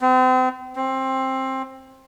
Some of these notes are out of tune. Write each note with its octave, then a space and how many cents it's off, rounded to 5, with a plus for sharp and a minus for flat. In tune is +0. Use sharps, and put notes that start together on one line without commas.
C4 -35
C4 +15